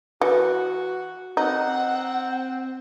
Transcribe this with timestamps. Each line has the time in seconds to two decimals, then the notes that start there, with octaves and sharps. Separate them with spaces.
0.21 E3 F#4
1.37 C4 D#4 F#5